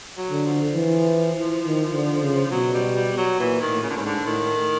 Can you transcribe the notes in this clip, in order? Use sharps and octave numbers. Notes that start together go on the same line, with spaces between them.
F#3
D3
F3
E3
D#3
D3
C#3
B2 F#3
G3
G3
F#3
A#2 E3
D#3
A2
C#3
D3
G#2 C#3
D3
A2 D#3